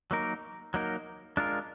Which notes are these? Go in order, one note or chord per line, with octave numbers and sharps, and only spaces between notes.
F#3 A#3 D#4 A#4
F#3 A#3 D#4 A#4
G#3 D4 F4 A#4